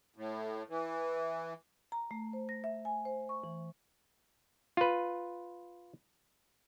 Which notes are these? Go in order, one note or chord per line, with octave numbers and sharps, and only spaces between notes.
A2
E3
A#5
A3
C5
A#6
E5
G#5
C5
C#6
E3
F4 B4